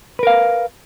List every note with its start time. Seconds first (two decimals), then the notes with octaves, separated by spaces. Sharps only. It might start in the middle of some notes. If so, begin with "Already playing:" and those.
0.19 B4
0.23 A#4
0.27 F5